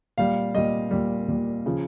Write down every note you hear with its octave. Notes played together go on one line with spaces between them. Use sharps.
A#2 G3 F5
A#2 G3 D#5
A#2 G3
A#2 G3
C#3 F3